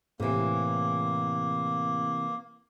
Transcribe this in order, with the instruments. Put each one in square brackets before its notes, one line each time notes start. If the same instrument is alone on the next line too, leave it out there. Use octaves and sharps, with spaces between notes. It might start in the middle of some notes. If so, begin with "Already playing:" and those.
[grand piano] A2 [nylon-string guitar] C3 E3 [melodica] A#3